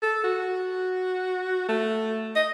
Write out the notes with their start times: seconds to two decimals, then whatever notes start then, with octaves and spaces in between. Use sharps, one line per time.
0.02 A4
0.24 F#4
1.68 A3
2.36 D#5